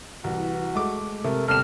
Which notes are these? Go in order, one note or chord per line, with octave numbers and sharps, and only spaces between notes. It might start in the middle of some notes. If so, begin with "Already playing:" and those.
C2 E3 F#4
G#3 A3 D6
C3 A3 A#4
G1 C3 G4 A4 F6 E7